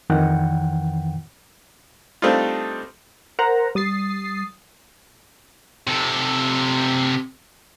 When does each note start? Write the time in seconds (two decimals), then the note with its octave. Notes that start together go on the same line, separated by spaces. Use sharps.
0.10 F2 D#3 E3 F#5 G5
2.22 G3 A3 C4 D4 D#4 F4
3.39 A#4 C5 F#5 A#5
3.75 G3 D#6 A6 C7
5.87 C3 A4